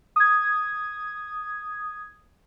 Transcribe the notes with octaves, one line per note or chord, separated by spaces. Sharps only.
D#6 G#6